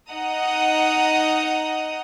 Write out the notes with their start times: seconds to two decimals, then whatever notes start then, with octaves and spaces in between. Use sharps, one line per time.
0.11 D#4 D#5 F#5 A#5 D#6